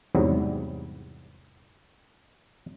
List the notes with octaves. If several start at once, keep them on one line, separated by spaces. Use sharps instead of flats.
E2 G#2 C3 F#3 G3